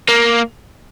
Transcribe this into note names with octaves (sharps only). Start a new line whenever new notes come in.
A#3